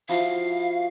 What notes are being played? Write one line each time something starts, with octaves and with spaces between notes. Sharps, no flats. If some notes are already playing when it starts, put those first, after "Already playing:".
F3 E4 F#4 F5